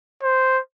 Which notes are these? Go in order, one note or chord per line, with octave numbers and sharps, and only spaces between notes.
C5